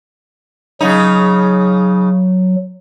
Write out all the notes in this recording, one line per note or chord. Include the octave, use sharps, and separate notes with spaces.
C#3 F#3 D#4